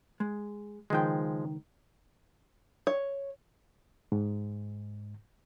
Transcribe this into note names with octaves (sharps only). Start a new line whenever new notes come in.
G#3
C#2 D#3 F3 G#3 G5
C#5
G#2